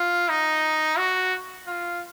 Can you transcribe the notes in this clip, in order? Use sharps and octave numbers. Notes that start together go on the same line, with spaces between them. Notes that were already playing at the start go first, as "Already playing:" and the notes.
Already playing: F4
D#4
F#4
F4